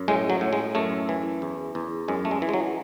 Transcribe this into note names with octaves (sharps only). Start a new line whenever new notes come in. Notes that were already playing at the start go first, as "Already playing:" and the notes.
Already playing: F#2
A2 G#3
F#3
A2
G#3
F#2 A3
E3
E2
E2
F#2 G#3
A3
G#3
E3
G#3
F#3